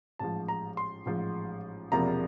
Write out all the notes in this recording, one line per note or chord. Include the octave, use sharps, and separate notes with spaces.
A1 G#2 F3 A5
A#5
C6
A1 G#2 F3
E1 E2 C3 F3 A#3 A#5